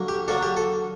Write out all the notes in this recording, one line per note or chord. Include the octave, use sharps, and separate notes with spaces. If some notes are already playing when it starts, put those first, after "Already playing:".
Already playing: D3 F#3 A#3
G4
D3 F#3 A#3 D4 A4
G4
A4